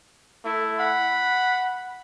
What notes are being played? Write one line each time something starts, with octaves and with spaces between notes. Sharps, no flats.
A3 E4
F#5 B5